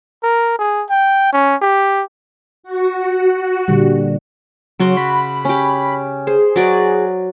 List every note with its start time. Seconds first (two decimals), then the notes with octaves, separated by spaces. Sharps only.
0.23 A#4
0.59 G#4
0.90 G5
1.33 C#4
1.61 G4
2.63 F#4
3.68 A#2 D3 G3
4.80 C#3 F#3 F#4 C6
4.97 B5
5.45 C#4 G4
6.27 G#4 C5
6.56 F#3 F#4 D5